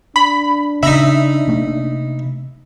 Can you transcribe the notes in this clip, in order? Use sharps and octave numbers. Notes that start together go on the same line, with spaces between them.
D4 B5
C#3 D#4 E5 A#5 B5
C3 A3 A#3